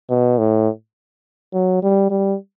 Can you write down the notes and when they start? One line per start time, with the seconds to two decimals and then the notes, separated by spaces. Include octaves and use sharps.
0.10 B2
0.39 A2
1.54 F#3
1.83 G3
2.10 G3